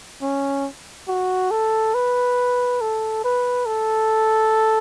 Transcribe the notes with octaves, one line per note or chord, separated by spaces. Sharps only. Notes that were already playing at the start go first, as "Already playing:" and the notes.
C#4
F#4
A4
B4
A4
B4
A4